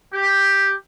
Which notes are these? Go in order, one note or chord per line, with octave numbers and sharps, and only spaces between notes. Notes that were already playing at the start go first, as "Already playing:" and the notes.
G4